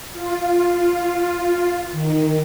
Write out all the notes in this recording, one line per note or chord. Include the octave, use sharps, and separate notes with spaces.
F4
D#3